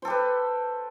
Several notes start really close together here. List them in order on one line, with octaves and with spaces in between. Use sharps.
C5 A4 G4 B4